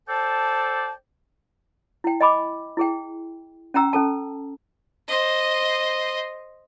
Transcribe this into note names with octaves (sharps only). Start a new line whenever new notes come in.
A4 C5 D5 G5 A5
E4 G5
D#5 G#5 B5 D6
E4 G#4 G5
C#4 G5 A#5 E6
C#4 A4 A5
C5 D#5